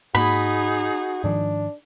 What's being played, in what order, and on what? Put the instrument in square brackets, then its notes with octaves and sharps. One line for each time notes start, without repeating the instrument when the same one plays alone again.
[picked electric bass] G#2 A#3 [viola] D#4 G#4 [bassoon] F#4 [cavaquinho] B5
[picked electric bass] G#2 D#3 F3 [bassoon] D4